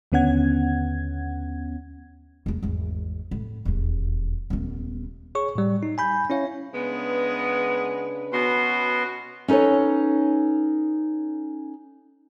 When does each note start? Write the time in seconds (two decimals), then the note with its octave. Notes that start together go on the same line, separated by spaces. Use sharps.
0.12 D#2 D3 B3 C#4 F#5 G#6
2.46 E2 A#3
2.63 G#1 E2
3.31 A2
3.65 D#1 E2
4.50 D#1 B3
5.35 G#4 C#5 C#6
5.56 A2 G3
5.83 D#4
5.98 G#5 B5 G6
6.30 C#4 E4 C#5 F5
6.74 C#3 G#3 B3 D4 B4
8.33 B2 B3 C#4 F#4 C6
9.48 C#4 D#4 A4 B4 C#5